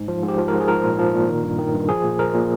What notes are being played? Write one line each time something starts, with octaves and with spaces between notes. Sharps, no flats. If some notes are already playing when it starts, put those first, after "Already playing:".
Already playing: G#2
F3
G#2
G4
F3
G#2 A#4
G#4
F3 A#4
A#2
F3
A#2
D#3
G2
D#3
G2
F3 G#4
A#2
F3 A#4
A#2